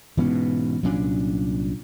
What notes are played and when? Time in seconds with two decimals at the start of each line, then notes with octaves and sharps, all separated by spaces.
0.17 G#2 B2 E3 B3 C#4
0.83 C2 A#2 F#3 C#4 D4